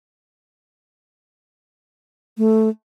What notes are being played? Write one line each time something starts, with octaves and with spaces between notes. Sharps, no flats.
A3